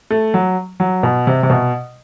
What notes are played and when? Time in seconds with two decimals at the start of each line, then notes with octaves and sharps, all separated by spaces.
0.10 A3
0.34 F#3
0.80 F#3
1.03 B2
1.27 C3
1.43 C3
1.50 B2